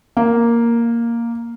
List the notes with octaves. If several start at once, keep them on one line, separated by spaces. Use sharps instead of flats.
A#3